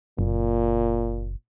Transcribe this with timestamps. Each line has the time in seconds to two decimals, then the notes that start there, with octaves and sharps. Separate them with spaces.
0.19 F#1 A#2